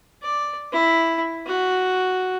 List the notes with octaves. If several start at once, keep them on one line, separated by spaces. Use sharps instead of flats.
D5
E4
F#4